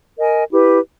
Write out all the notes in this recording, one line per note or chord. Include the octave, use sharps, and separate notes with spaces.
A#4 D#5 G#5
E4 G4 B4